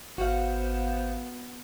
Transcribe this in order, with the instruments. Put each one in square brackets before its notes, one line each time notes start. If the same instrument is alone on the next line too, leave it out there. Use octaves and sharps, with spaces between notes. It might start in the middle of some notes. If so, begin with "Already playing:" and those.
[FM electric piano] G#1 F5 [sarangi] B3 [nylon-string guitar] F#4 [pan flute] C5